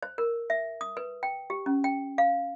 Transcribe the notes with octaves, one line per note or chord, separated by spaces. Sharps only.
C5
A#4
E5
D#6
B4
G5
G4
C#4
G5
F5